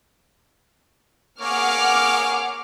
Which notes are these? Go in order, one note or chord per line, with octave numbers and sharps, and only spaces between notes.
A#3 G#4 C#5 F#5 D6 F6